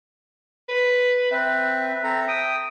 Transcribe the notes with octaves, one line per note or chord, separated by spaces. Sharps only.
B4
C4 B4 E5
C4 A4 A#5
G5 D#6